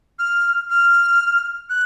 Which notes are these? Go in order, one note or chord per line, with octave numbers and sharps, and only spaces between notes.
F6
F6
F#6